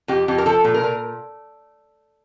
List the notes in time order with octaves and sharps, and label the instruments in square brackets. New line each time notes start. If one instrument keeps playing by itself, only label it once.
[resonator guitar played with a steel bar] F2 G4
F2 G4
A#4
F3 A4
A#2
A#4
A#2